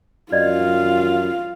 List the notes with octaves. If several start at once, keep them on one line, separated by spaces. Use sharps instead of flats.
F#2 F4 D5 D#5 F5